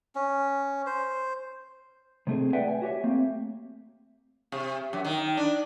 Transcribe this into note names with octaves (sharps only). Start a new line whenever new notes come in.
C#4
C5
C3 G#3 A3 C4 G#4
G#4 B4 D5 E5 F#5 G5
G#5
F#4 G4 C#5 E5
A3 A#3 C4
C3
F#2
D#3
D4